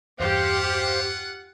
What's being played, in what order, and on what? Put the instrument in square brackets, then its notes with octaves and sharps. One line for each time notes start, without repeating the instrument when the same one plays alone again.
[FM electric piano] E2 G2 [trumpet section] F4 F#5 [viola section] G4 [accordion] C5 F5